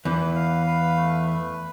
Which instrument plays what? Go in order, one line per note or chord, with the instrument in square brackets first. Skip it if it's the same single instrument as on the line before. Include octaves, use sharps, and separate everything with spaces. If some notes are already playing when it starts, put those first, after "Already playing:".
[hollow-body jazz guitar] E2 E3 [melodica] B4
[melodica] F5
B4
A3
B4